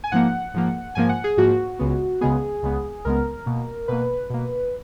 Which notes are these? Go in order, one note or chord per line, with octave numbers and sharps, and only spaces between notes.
G#5
G#2 F3 A#3 F#5
G#2 F3 A#3
G#2 F3 A#3 G#5
F#5
G#4
G#2 F3 A#3 F#4
C#2 C#3 G#3 B3
C#2 C#3 G#3 B3 G#4
C#2 C#3 G#3 B3
C#2 C#3 G#3 B3 A#4
B2 A#3
B2 A#3 B4
B2 A#3